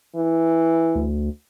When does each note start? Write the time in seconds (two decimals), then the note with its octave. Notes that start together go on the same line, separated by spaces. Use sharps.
0.16 E3
0.95 D2